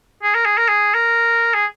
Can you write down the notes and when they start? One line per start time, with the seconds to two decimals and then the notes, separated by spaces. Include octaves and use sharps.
0.23 G#4
0.35 A#4
0.45 G#4
0.57 A#4
0.69 G#4
0.94 A#4
1.54 G#4